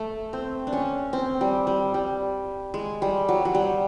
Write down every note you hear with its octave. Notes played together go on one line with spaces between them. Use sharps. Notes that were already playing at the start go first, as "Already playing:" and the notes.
Already playing: A3
C4
D4
C#4
C4
G3
G3
G3
G#3
G3
F#3
F#3
G3